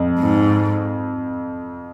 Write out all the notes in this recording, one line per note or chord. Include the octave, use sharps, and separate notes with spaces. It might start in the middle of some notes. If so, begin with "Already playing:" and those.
Already playing: F2
G#2